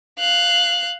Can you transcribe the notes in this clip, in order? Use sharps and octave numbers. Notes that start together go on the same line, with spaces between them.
F5 F#6